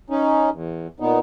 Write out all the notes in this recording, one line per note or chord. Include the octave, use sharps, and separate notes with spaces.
C#4 D#4
E2
A#2 B3 D#4